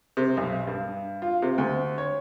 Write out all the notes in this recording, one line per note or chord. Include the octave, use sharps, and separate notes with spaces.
C3
B1
G2
F4
C3
D2
C#5